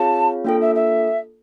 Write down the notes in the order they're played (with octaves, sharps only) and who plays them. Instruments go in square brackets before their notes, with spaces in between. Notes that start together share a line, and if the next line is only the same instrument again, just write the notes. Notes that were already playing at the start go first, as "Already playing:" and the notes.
Already playing: [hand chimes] C4 F4 G#4 C#5 F5 [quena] A5
[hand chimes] A#3 D4 F4 A4 [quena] G5
[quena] E5
E5